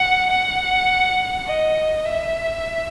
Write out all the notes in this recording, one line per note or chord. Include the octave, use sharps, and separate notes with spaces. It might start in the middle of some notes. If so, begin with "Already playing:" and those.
Already playing: F#5
F#5
D#5
E5